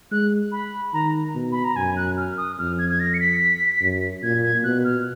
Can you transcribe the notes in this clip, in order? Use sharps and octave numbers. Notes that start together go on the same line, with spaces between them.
G#3 F#6
B5
D#3 A#5
B2
B5
A#5
F#2 G#5
F#6
F6
D#6
F2 F6
G#6
G#6
A#6
C#7
B6
F#2
A#2 G#6
G#6
B2 F#6
F6